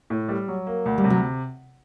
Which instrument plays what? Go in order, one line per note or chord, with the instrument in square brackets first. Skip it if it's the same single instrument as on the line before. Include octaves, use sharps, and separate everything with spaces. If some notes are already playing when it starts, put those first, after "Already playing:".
[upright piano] A2
G3
F#3
A#3
D2
[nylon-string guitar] G3
[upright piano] C3
[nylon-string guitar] F#3